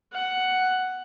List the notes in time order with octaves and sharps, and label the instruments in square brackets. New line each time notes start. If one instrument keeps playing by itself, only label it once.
[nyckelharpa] F#5